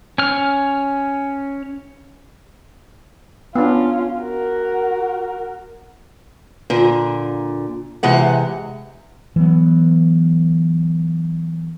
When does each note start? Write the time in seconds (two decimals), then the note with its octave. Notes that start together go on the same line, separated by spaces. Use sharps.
0.18 C#4 F6
3.55 B3 C#4 D4 F4
4.21 F#4 A#4
6.70 A#2 D3
8.03 C3 E3 G#3 F#5
9.36 E3 F#3 B3